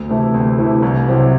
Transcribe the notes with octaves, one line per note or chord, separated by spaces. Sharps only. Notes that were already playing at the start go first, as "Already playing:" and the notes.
Already playing: D2
C3 E3 A3 E4
D2
C3 E3 A3 E4
C2
C3 F#3 C4 E4